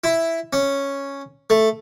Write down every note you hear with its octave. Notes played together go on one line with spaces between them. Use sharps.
E4
C#4
A3